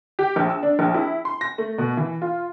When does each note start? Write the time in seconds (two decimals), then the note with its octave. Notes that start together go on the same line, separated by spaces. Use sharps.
0.19 G4
0.36 A#1
0.50 E6
0.63 D4
0.79 A#1
0.94 E4
1.25 C6
1.41 A#6
1.58 A3
1.78 B2
1.97 E3
2.22 F4